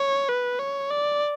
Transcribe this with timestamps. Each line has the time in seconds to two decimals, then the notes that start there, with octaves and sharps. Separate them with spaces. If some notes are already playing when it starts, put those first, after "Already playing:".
Already playing: C#5
0.29 B4
0.59 C#5
0.90 D5